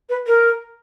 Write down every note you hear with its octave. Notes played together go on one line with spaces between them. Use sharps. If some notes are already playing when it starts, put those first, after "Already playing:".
B4
A#4